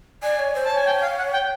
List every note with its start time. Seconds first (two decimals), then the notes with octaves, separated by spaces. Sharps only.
0.23 D5 G#5
0.39 C#5
0.55 C5
0.65 A5
0.70 C#5
0.76 G#5
0.86 G5
1.02 F5
1.18 F#5
1.33 G5